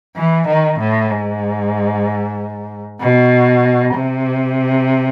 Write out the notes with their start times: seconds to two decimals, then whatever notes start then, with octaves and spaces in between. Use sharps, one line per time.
0.16 E3
0.48 D#3
0.80 A2
1.11 G#2
3.00 B2
3.94 C3